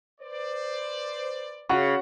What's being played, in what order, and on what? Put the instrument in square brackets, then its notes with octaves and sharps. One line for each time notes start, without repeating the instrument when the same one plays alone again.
[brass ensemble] B4 C5 D5
[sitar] C#3 [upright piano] F#4 F#5 C#6